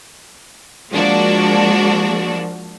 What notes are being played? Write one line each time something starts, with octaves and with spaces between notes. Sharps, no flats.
F3 G#3 A#3 D4 F#4